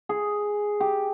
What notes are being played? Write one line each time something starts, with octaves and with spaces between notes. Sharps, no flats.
G#4
G4